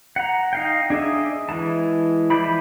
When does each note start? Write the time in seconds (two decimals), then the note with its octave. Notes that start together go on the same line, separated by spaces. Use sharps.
0.16 F#5 A#5
0.53 D#4 F5 G5
0.90 D4 G#4 D#5 E5
1.49 E3 G#3 A5
2.30 E3 F3 C5 D5 B5